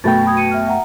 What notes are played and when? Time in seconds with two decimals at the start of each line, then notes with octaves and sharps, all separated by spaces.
0.04 F#2 B2 A3 F#4 G5 B5 A6
0.26 B5 D#6 G#6
0.37 C#7 D#7
0.51 E5 F6
0.67 E5 F#5 A#5